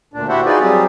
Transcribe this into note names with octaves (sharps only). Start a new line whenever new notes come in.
D2 A#2 D4
E4 F#4 G4 C5 E5 F#5
D#4 F4 F#4 G#4 B4 D5
F#3 G3 C4 G4 G#4